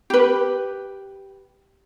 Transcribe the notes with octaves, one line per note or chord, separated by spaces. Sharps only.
G4 B4